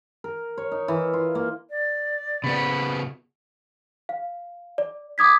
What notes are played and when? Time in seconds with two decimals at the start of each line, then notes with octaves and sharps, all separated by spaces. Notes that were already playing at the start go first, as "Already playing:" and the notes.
0.24 A#4
0.58 C#5
0.72 D#4
0.88 E3
1.14 F4
1.35 A#3
1.70 D5
2.44 C#3 B3 B5
4.09 F5
4.78 D5
5.18 D6 D#6 G#6 B6